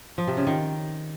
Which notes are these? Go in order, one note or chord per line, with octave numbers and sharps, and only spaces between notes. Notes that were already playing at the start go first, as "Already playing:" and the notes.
F3
C3
C#3
D#3